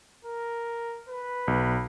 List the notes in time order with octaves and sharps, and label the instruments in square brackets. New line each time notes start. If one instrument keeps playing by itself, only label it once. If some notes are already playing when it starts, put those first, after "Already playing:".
[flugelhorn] A#4
B4
[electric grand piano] B1